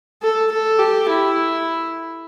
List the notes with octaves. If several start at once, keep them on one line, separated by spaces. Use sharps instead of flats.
A4
A4
G4
E4